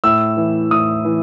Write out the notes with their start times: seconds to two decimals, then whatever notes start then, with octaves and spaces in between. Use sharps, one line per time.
0.04 A2 E6
0.37 E3
0.71 A2 D#6
1.05 E3